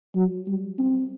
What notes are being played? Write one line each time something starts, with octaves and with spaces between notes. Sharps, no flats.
F#3
G3
C4